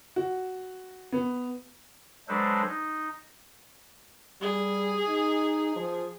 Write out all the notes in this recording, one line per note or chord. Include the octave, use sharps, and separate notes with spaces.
F#4
B3
F#3 G#3 D4 A4 B4 C5
D#4
G3 G#4
D#4
F3